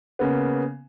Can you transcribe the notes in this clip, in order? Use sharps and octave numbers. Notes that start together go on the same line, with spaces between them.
C#3 A#3 B3